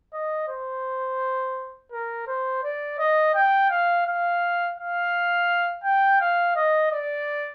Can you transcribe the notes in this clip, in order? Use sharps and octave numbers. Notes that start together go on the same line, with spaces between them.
D#5
C5
A#4
C5
D5
D#5
G5
F5
F5
F5
G5
F5
D#5
D5